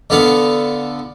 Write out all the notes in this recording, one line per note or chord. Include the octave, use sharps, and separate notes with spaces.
D3 B3 F5